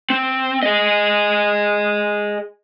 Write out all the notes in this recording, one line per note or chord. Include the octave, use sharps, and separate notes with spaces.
C4
G#4 D#5